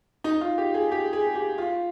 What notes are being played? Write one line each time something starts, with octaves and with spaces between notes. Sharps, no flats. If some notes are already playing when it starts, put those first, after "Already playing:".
D#4
F4
G4
G#4
G4
G#4
G4
F4